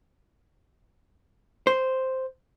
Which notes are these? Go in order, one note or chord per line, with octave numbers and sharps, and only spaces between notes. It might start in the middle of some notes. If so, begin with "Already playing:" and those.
C5